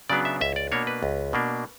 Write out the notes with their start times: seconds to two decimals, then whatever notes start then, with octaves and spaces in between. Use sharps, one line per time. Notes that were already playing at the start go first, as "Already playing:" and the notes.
0.10 C#3 F#3 B3 D4 D5
0.25 E5
0.41 C#2 E5
0.56 D5
0.72 B2 A#3 D4 C#5
0.87 B4
1.03 C#2
1.33 B2 A#3 D4